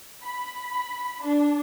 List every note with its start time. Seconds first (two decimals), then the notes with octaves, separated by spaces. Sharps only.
0.24 B5
1.24 D4